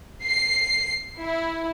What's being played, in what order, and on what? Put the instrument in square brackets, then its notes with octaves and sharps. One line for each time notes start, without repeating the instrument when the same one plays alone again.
[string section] C7
E4